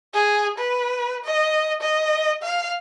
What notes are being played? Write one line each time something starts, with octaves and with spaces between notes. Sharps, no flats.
G#4
B4
D#5
D#5
F5